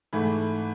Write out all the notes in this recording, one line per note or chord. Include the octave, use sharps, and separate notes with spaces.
G#2 E3 A3 B5